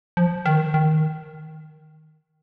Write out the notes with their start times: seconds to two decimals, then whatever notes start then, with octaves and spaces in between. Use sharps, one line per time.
0.17 F3
0.46 D#3
0.74 D#3